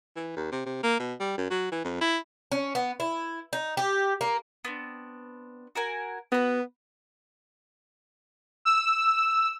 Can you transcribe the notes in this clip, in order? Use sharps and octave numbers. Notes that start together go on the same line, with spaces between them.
E3
D#2
C3
C3
A#3
B2
G3
F#2
F#3
E3
F2
E4
C#4
B3
E4
D#4
G4
A#3
B3 C4 D4
F#4 A#4 G#5
B3 F#4 B4
E6